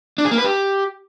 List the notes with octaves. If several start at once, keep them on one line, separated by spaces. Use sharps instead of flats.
D4
G#4
A#3
B4
G4